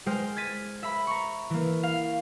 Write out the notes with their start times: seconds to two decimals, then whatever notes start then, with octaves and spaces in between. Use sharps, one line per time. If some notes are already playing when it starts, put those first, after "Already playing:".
0.06 G#3 C5 G5 F6
0.36 G#6 A6 B6 D#7
0.83 E5 B5
1.07 A#5 C#6
1.50 E3 A#3
1.83 F5